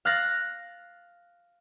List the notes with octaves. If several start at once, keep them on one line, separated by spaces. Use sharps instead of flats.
F5 F6 F#6 A6 A#6